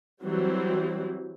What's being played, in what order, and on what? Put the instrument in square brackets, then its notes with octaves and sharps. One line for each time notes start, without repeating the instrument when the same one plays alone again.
[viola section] E3 F#3 G3 C4